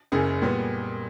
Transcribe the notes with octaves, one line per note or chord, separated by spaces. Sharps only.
F#1 F#2 C#3 G#4
A#2 G3 B3